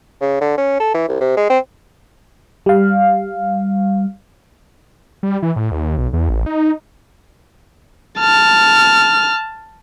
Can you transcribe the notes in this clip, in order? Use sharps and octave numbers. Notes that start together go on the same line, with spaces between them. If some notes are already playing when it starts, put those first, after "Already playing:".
C#3
D3
C#4
A4
E3
C2
C3
G#3
C4
G3 F5
G3
E3
A2
D#2
B1
E2
A1
D#4
A5 F6